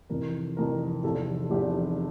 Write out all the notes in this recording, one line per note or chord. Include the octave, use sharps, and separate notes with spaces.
F1 F2 E3 A#4
F1 F2 E3 A#4
F1 E2 C3 F3 A4
F1 E2 C3 F3 G4